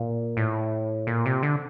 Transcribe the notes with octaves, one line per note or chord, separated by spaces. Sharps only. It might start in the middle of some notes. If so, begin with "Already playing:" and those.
Already playing: A#2
A2
A#2
C3
D3